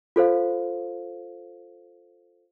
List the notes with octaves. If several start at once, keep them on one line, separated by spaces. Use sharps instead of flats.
F4 A4 C5 F5